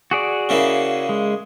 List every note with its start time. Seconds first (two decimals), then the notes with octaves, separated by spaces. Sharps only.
0.11 F#4 G#4 D5
0.49 C#3 A#3 E4
1.09 G#3